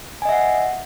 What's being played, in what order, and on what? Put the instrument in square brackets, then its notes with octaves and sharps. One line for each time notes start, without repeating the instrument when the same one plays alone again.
[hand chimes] G#5
D#5
E5
F#5